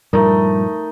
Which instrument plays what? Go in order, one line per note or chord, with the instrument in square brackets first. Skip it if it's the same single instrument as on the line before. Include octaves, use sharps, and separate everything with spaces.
[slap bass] G2 A#2 F3 [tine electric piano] G3 [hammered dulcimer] A3 D#4 [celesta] A#4